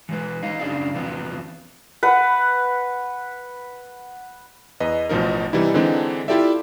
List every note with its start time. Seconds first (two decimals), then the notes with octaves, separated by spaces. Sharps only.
0.09 E3 G#3 B4
0.43 D#4 D#5 F5
0.59 F#2 C#3 D4 G#4 D5 F5
0.94 E2 C3 F3 B3 C4
2.03 B4 F#5
4.80 E2 B4 D#5
5.09 A1 B2 F3 D#4 A#4
5.53 C3 E3 G3 D#4 E4
5.74 D3 E3 G#3 C4 D4 D#4
6.28 E4 F4 G4 A4 D5 E5